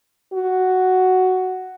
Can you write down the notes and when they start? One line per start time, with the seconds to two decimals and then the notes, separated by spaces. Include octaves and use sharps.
0.33 F#4